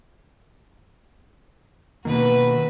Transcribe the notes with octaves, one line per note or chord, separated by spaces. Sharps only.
B2 D#3 A#3 F#4 B4